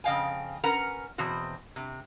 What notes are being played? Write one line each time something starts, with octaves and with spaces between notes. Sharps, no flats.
F2 C#3 D#5 F5 G5 G#5
C#4 A#4 B4 F#5 A#5
E2 B2 C4 F#4
C3